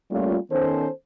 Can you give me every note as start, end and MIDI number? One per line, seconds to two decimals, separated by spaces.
0.10 0.36 55
0.10 0.36 57
0.10 0.36 58
0.10 0.36 61
0.10 0.36 65
0.50 0.87 51
0.50 0.87 59
0.50 0.87 61
0.50 0.87 69
0.50 0.87 72